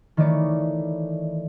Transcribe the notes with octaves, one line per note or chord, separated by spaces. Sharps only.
D#3 E3 A3 C#5 D5 D7